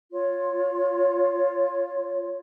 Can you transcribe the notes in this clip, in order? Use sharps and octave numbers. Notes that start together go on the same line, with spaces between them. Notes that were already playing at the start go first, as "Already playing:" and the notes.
F4 C#5